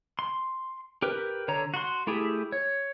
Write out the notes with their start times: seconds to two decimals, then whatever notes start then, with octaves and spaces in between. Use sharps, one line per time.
0.19 C6
1.02 G4 A#4 B4
1.48 D3 C#5 A#5
1.74 F#4 C6
2.07 A3 E4 G4 G#4
2.52 C#5